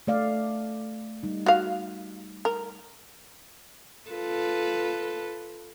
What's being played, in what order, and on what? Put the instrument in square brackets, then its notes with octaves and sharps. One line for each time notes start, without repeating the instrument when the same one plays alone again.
[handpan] A3 D5 F5
G3 D#4
[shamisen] F#4 F5
A#4
[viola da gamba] F4 A4 B4